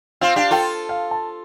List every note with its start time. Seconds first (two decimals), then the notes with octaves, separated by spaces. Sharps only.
0.21 C4 F4 F5
0.36 D4 G4 F5
0.51 F4 A4 G5
0.89 F5
1.11 A5